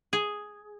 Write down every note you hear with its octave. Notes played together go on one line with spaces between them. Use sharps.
G#4